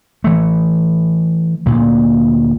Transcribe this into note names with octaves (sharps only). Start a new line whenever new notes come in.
E3 A3
D2 A#2